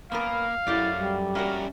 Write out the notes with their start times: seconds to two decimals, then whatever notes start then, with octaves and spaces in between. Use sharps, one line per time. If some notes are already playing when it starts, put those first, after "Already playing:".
0.12 F#2 A#3 B3 A#4 F5
0.67 F#2 A3 C#4 E4 G4 D5
0.97 G3
1.35 A#3 C#4 F#4 A#4 C#5 E5